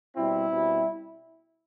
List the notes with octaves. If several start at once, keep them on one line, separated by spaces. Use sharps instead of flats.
B2 G3 C4 E4
B2 G3 C4